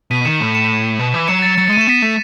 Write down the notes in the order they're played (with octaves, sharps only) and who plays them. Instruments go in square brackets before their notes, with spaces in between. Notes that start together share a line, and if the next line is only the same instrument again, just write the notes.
[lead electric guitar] B2 [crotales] B6 D#7
[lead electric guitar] D#3 [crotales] C#7 E7
[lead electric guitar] A2
[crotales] C#7 E7
[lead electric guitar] B2
E3
[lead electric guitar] F#3 [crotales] C#7 E7
[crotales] A6 C#7
[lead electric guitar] F#3 [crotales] A6 C#7
[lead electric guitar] G#3
[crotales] D#7
[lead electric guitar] A3 [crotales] E7
[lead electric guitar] B3 [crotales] B6 D#7
[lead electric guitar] A3